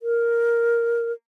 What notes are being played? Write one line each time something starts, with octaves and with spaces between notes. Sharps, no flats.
A#4